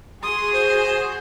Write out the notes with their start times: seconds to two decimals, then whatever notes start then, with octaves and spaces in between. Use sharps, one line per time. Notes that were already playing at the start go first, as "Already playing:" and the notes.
0.23 F#4 G#4 C6 D#6
0.53 C5